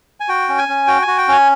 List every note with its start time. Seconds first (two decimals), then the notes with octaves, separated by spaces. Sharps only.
0.20 G#5
0.29 F#4 G5
0.49 C#4
0.58 G#5
0.68 C#4
0.87 F#4 G5
1.02 G#5
1.07 F#4
1.18 G5
1.28 C#4 G#5